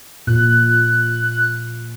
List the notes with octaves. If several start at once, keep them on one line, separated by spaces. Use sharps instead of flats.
A#2 F#6